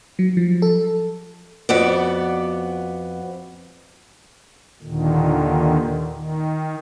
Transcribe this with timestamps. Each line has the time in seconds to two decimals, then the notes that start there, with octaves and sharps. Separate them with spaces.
0.19 F#3
0.37 F3
0.62 A4
1.69 F2 B3 F#4 D5
4.82 D#2 A#2 D3 D#3
6.09 D#3